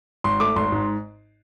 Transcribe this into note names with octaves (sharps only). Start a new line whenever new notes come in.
G#1 C6
A3 D6
G#1 C6
G#2